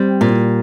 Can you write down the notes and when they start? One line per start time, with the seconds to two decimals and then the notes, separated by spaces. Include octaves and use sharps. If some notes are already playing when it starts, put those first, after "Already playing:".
Already playing: G3 C4
0.21 A#2